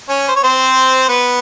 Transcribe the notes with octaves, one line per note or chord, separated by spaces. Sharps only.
C#4 C#5
C5
C#5
C4 C5
B3 B4